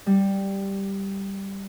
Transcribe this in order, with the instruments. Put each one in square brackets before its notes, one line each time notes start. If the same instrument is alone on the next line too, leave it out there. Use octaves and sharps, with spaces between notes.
[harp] G3